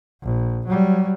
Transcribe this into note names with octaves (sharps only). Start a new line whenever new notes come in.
A#1
F#3 G3